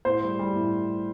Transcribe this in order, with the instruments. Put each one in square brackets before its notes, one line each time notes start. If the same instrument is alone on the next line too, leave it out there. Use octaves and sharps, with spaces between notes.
[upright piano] A2 C5
G3
G3
A2